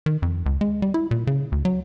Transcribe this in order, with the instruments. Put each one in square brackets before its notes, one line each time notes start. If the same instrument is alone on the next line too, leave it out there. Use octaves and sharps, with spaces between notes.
[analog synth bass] D#3
F2
C#2
G#3
G3
E4
A#2
C#3
D2
F#3